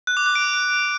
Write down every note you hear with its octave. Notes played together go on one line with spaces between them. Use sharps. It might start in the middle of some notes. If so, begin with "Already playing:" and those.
F#6
D6
F#6
D7